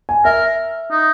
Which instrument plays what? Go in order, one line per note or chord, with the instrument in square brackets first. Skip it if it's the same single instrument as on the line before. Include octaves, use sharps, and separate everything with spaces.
[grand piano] G#5
[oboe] A#4 [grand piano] E5
[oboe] D#4